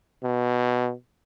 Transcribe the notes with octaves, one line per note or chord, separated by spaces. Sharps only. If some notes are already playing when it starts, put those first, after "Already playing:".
B2